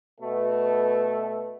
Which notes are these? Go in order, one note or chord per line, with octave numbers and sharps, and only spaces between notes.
B2 A3